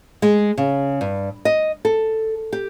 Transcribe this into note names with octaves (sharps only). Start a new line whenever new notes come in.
G#3
C#3
G2
D#5
A4
G4